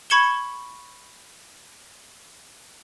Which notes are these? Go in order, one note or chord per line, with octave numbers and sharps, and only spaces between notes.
B5 C#6 G#6 C#7 E7 G7